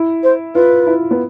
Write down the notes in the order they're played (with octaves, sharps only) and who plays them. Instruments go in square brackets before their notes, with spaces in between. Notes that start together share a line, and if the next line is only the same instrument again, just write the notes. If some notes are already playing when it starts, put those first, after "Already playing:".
Already playing: [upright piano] E4
[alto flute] C5
[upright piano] F4 [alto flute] B4
[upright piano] E4
B3